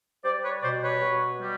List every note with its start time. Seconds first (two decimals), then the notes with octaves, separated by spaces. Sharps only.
0.24 G3 C5 D5
0.43 B4 C#5
0.62 B2 C5 D5
0.82 B4 C#5
1.02 B2
1.40 G3